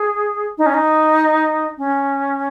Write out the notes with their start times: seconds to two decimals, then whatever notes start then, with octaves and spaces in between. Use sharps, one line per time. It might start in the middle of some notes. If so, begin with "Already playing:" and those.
Already playing: G#4
0.58 D#4
0.66 C#4
0.74 D#4
1.78 C#4